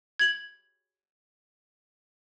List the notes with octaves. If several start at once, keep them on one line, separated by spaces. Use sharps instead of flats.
G#6 F#7